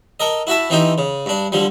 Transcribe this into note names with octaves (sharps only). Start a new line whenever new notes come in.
A4 A#4 D#5
E4 F#4 E5 A5
E3 C4 D#4 G4
C#3
G2 D4
D3 F3 G3